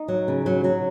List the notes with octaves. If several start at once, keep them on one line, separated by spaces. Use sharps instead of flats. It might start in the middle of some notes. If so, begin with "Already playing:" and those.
Already playing: D#4
F#3
C#3
F#3
F#3